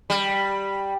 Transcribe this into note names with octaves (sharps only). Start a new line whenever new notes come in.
G3